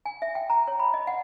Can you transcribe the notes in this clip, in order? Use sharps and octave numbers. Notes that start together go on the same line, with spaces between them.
G#5
E5
G5
A#5
C#5
B5
D#5
F#5